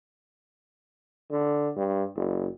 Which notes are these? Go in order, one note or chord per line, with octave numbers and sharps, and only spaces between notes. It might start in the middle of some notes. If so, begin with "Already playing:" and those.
D3
G2
F#1